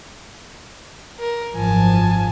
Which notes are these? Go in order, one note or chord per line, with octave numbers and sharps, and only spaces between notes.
A#4
G#1 F#2 F3 G#5 A5